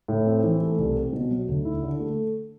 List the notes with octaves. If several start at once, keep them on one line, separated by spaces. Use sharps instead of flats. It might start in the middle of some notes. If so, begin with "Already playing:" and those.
A2
C4
E3
A3
C2
C4
B2
F#3
D2
E4
D3
A3